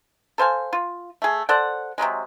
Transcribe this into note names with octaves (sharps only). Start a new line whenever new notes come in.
A4 C5 F5 G#5
F4
A3 G#4
A4 C5 D5 F#5
C3 D#3 F#3 G#3